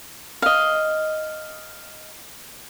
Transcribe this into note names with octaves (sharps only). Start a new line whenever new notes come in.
D#5 F5